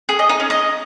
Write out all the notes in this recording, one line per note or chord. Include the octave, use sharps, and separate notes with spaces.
G#4
D#5
D#4
C#4
D#5